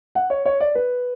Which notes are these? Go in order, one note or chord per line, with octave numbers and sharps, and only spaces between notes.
F#5
C#5
C#5
D5
B4